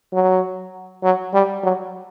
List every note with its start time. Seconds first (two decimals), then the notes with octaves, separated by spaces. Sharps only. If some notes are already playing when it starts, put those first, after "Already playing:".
0.13 F#3
1.03 F#3
1.34 G3
1.63 F#3